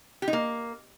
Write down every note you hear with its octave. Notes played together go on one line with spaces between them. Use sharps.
G4
D#4
A#3